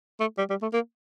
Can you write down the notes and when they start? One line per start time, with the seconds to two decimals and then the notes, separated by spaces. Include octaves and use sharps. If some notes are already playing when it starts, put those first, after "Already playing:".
0.20 A3
0.38 G3
0.50 G3
0.62 A3
0.73 A#3